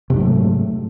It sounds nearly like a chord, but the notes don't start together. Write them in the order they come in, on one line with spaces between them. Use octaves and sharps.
C3 G#2 F#3 A3